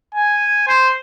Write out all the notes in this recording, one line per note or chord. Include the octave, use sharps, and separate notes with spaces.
G#5
C5